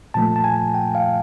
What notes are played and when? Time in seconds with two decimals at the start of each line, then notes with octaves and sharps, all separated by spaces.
0.14 A#2 F3 A3 A5
0.36 A5
0.44 G#5
0.74 G5
0.95 F5